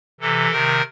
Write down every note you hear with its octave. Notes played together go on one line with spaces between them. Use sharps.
C3 E3 A4
C3 D#3 A#4